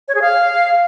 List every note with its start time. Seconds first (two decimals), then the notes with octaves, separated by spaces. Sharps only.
0.08 C#5
0.15 G#4
0.22 F5